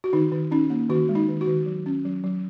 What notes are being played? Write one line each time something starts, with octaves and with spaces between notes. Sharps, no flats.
F#4
D#3 D#4
D#3
C#4 D#4
A#3
D#3 F#4
G#3
D#4
D#3
F#4
D#3
F#3
C#4
F#3
F#3